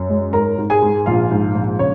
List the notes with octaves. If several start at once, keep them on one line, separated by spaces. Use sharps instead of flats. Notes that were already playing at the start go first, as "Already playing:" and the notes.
Already playing: F#2
G#3
G#2 A#4 A#5
G#2
G#4 G#5
G#2
A#1 F4 F5
G#2
A#1
C#3 C#5